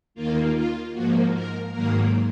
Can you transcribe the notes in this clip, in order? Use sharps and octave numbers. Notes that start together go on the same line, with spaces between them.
D#2 D#3 A#3 F4
F4
G#2 F3 A#3 F#4
A#4
G#2 D#3 F#3 A#3 A#4